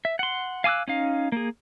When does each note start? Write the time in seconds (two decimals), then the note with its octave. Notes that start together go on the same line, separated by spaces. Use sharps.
0.05 E5
0.19 F#5 C6
0.64 F5 G#5 D6 E6 F#6
0.88 C#4 D#4 F5
1.32 A#3 G#4